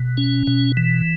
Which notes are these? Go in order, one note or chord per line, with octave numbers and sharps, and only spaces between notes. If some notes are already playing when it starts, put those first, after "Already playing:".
Already playing: B2
C#4
B2
E3